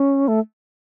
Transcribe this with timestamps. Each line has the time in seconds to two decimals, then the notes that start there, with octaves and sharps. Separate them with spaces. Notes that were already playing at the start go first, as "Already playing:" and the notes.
Already playing: C#4
0.28 A3